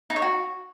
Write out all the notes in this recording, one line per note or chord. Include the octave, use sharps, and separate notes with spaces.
D#4
C#5
F#4